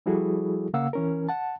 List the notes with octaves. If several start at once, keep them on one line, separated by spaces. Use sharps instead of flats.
F3 G3 E4 F#4 G#4 A4
C#3 A#3 F5 F#5 E6
E3 C#4 A#4
F#5 A5